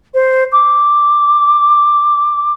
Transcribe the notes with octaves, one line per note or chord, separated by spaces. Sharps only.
C5
D6